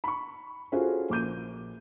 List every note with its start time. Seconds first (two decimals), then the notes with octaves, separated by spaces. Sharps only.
0.04 B5 C#6
0.72 C#4 F4 F#4 G#4 A4 C5
1.10 A#1 D6 G6 D#7